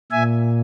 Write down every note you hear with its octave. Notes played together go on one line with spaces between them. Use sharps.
A#2 E5 G#5